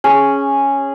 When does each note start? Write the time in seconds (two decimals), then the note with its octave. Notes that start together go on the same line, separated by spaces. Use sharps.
0.04 C#4 G#4